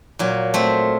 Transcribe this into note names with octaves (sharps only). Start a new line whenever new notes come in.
A#2 F#3
A3 C4